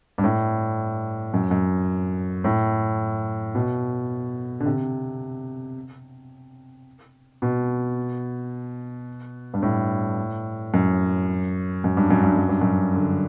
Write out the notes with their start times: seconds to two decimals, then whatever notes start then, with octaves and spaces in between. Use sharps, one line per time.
0.18 G2
0.24 A2
1.34 F#2
1.51 F#2
2.44 A2
3.55 B2
4.60 D3
4.66 C3
7.42 B2
9.54 G2
9.63 A2
10.74 F#2
11.84 F#2
11.97 G2
12.10 F#2
12.23 G2
12.36 F#2
12.49 G2
12.61 F#2
12.94 D3